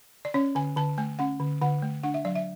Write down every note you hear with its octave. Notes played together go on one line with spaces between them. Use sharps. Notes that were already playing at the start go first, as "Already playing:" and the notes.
D5
C#4 C#5
D3 G#5
D3 A5
A3 G#5
C#4 F#5
D3
D3 F#5
A3
D4 F#5
E5
F#3 D5
E5